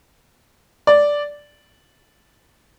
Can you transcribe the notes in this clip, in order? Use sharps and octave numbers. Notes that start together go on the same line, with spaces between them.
D5